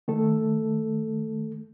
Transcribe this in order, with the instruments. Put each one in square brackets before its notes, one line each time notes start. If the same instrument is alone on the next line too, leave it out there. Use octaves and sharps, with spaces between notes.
[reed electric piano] D#3 A3 A4